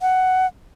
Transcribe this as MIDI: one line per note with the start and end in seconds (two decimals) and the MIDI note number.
0.01 0.46 78